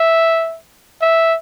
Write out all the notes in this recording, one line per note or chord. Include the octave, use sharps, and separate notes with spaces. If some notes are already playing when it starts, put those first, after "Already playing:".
Already playing: E5
E5